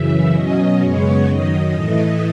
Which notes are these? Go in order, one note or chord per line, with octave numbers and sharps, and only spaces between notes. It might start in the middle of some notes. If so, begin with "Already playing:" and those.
Already playing: F#2 C#3 E3 E5
B2 F#3 C#4 D#5
F#2 C#3 G#3 B3 C#5
F#2 D#3 F#3 D#5
A2 E3 A3